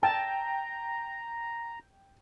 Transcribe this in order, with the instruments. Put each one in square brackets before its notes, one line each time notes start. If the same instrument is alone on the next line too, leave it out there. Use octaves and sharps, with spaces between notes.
[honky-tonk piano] G5 [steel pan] A5 [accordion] A#5